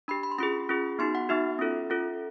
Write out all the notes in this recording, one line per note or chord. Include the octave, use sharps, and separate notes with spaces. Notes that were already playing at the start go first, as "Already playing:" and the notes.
D4 G4 B5
B5
C6
C#4 F4 G#4 B5
C#4 F4 G#4
B3 D#4 F#4 C6
F#5
B3 D#4 F#4 E5
C#4 F4 A4
C#4 F4 A4